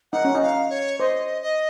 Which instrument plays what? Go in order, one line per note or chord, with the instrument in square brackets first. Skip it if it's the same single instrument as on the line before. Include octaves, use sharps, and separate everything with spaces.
[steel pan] D#4 [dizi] F#5
[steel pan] C#4
D#4
[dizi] F5
C#5
[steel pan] C5 [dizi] D#5
[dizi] D#5